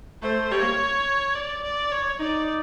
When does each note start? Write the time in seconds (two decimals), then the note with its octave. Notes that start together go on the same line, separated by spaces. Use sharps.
0.22 A3 C5
0.51 G3 C#5
0.61 A#3
1.35 D5
1.63 D5
1.92 C#5
2.20 D#4 D5